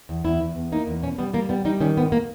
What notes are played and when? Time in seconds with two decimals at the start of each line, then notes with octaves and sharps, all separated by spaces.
0.09 E2
0.24 E2 E4
0.40 E2
0.56 E2
0.72 A#3 D#4
0.87 E2
1.03 B2 C#4
1.19 G3 B3
1.33 G3 A#3
1.49 G3 B3
1.65 G3 D#4
1.81 D#3 C#4
1.97 G#2 B3
2.12 A#3